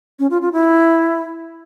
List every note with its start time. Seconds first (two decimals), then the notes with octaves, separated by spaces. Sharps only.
0.19 C#4
0.30 F4
0.42 F4
0.53 E4